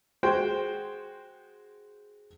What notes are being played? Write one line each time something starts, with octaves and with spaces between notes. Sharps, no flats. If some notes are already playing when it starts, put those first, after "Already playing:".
G#3 F#4 C5 G5